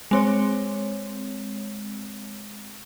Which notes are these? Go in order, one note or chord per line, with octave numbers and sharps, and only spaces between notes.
G#3 C4 C#5